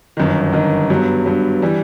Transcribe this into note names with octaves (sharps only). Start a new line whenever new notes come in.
G1 F#2 D#3
G1 F#2 D#3
G2 F#3 B3
G2 F#3 B3
E3 G3